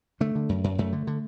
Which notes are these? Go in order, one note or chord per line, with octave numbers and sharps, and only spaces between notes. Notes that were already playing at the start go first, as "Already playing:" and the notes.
D3 A3
D3
F#2
F#2
F#2 A3
D3
D3